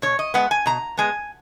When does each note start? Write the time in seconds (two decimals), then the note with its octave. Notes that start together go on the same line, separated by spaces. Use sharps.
0.02 B2 C#5
0.19 D#5
0.34 G#3 B3 F#5
0.51 G#5
0.66 B2 A#5
0.98 G#3 B3 G#5